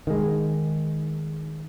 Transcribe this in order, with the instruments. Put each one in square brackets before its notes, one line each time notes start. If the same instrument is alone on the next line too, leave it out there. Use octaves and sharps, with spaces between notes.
[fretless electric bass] D#3 G#3